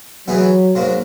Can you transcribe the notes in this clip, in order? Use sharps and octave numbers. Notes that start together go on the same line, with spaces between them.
E3 F#3 B3 D#4 G#4
G#2 F#3 A#3